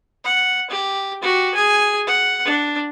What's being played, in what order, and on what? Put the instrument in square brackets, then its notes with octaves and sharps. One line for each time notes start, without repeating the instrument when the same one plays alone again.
[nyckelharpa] F#5
G4
F#4 G4
G#4 G#5
F#5
D4